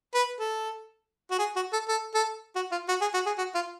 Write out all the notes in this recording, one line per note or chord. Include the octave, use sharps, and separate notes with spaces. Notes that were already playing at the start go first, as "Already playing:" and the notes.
B4
A4
F#4
G#4
F#4
A4
A4
A4
F#4
F4
F#4
G#4
F#4
G#4
F#4
F4